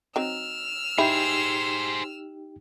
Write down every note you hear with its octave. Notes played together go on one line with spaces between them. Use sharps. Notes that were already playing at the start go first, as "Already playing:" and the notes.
F#3 C4 D#4 E6 F6
D#4 E4 G4 G#4 C5 G5